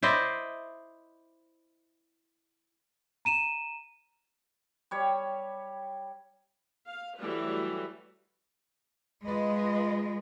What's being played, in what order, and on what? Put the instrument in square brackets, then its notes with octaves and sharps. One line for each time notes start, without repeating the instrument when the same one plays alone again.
[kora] E4 C5 D5 D#5
[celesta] A#5 D#7 E7
[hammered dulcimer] G3 C#5
[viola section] F5
E3 F#3 G3 A3 B4
[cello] G#3 [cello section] F4 B4 D#5